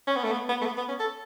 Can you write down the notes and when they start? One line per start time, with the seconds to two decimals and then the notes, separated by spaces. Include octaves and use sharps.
0.08 C#4
0.16 B3
0.24 A3
0.32 B3
0.49 B3
0.61 A3
0.66 B3
0.78 B3
0.88 C#4
0.99 A4